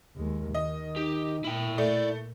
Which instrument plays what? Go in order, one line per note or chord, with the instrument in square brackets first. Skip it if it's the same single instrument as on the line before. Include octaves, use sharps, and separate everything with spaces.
[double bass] D#2 G#3
[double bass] D#3 [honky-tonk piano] D#5
[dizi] D#4 [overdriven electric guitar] G4
[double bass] A#2 [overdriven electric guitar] E4 G5
[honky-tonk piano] A3 [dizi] D5